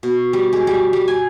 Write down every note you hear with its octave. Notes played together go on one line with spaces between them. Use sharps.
B2
G3
G#3
G3
G3
G#5